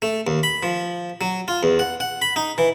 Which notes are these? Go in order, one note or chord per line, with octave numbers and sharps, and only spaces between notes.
A3
D#2
B5
F3
F#3
F4
E2
F#5
F#5
B5
D#4
E3